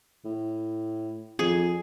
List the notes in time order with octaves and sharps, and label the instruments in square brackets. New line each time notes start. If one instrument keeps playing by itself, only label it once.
[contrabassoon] A2
[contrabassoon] F2 [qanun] G#4